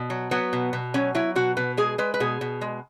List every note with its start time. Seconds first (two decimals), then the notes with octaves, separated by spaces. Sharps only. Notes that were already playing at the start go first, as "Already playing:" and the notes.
Already playing: B2
0.10 F#3
0.31 F#3 B3
0.53 B2
0.73 B2
0.94 F#3 C#4
1.15 F#3 E4
1.36 B2 F#4
1.57 B2 B4
1.77 G#3 G#4
1.98 G#3 B4
2.14 B4
2.20 B2 G#4
2.41 B2
2.61 G#3